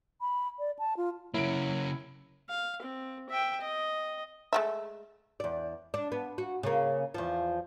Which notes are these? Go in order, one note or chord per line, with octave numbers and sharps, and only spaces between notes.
B5
D5
A5
F4
C#3 F#3 A#3 E4 D7
F5
C4
E5 G5
D#5
G#3 A3 E5
E2 D5
D4
B3
F#4
C#3 A#3
E2 F3